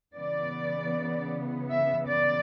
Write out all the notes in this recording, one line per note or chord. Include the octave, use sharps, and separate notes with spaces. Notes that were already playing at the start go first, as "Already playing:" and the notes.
C#3 E3 B3 D5
E5
D5